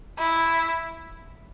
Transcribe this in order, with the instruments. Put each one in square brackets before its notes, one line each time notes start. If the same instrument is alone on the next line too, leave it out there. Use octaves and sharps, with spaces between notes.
[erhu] E4